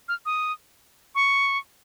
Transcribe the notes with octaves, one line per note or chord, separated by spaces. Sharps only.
F6
D#6
C#6